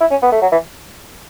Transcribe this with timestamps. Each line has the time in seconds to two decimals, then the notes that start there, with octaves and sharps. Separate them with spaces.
0.01 E4
0.11 C#4
0.22 B3
0.32 A3
0.42 F#3
0.52 E3